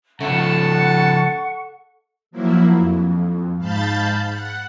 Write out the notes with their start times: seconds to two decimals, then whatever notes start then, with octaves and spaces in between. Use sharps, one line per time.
0.20 C#3 F3 A3 F#5 A5 C#6
2.31 F3 F#3 A#3 E4
2.77 F2
3.58 G#2 F5 A5 B5 G6 A6
4.31 F#5